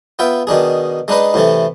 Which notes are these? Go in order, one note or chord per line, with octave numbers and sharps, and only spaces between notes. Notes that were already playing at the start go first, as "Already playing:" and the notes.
B3 F4 E5 G5
B2 D#3 D4 G#4
G#3 D4 D#4 B4 D#5
A2 C3 E3 A3